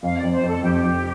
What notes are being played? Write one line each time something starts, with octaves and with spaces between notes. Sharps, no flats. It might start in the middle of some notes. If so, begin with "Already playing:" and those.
F2 F5
D5
F2
C5
F2 A4
F2 G4
F3